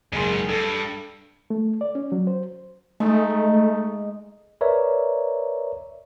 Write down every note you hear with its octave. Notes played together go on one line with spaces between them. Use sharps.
F#1 G#2 D#3 G#4 C6
G2 A4
A3
D5
C#4
F#3
C5
G#3 A3 D#4
A#4 B4 C#5 D5 E5 A#5